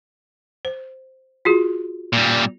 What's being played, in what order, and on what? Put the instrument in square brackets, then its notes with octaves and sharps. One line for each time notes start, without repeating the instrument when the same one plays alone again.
[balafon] C5
F4 F#4 G#4
[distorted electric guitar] A#2 G3